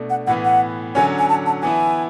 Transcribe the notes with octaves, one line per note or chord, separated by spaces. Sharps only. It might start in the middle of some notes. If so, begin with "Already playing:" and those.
Already playing: B2 A3 D4
F#5
A2 E3 B3 F#5
F#5
D3 F#3 C#4 G#5
G#5
A5
A5
E3 B3 E4 G#5